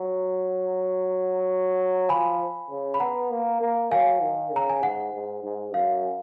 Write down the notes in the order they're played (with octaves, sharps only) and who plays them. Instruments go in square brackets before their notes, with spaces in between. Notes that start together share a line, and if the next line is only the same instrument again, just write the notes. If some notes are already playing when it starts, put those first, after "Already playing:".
Already playing: [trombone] F#3
[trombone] F3 [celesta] G#5 B5
[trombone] C#3
[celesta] B5
[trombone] B3 [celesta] F#5 A#5
[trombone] A#3
A#3
[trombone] F#3 [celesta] F5 G#5
[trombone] D#3
[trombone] C#3 [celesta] A#5
[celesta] G#5
[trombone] G#2 [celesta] F#5
[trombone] G#2
G#2
[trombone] F#2 [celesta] F5